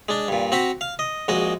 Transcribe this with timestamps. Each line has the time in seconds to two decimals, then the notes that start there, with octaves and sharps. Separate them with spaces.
0.09 G#3 D4
0.28 G2 A#2
0.52 C4 F#4 F#5 A#5 B5
0.81 F5
0.99 D#5
1.28 A#1 G#3 F#4 D#5